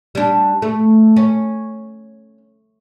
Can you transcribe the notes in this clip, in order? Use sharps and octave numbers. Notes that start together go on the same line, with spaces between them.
G3 D4
A3
C#4